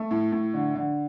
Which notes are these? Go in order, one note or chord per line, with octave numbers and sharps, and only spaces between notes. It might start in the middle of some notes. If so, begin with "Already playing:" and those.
Already playing: A3
A2
A2
D3
D3